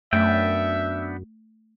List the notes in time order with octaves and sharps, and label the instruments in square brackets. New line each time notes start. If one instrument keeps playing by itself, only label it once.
[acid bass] F#2 [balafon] A3 [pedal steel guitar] B3 D4 G5 [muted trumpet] E5